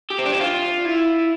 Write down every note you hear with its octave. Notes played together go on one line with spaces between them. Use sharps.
G4
C4
D4
E4
F4
E4